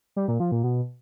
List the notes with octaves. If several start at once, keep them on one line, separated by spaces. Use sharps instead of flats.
G3
A#2
F3
A#2
B2